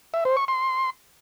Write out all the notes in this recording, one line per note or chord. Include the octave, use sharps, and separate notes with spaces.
E5
C5
C#6
C6